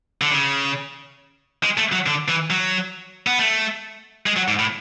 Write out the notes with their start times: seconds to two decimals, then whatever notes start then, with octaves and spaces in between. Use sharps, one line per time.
0.21 D3
0.31 C#3
1.63 G#3
1.77 A3
1.92 F#3
2.06 D3
2.28 E3
2.50 F#3
3.27 B3
3.39 A3
4.26 G#3
4.36 F#3
4.48 G#2
4.59 A2